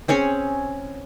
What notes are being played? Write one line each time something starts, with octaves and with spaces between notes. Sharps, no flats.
C4 C#4 G#4 C#5